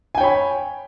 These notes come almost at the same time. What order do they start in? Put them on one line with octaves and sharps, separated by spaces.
G#5 G5 C#5 B5